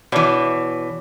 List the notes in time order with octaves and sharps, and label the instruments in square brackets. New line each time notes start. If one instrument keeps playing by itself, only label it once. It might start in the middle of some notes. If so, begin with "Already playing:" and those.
[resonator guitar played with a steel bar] B2 E3 [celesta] C#5 D5 D6